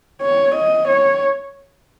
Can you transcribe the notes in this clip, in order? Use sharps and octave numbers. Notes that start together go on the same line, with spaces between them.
C#5
D#5
C#5